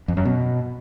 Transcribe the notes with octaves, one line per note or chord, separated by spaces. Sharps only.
F2
F#2
B2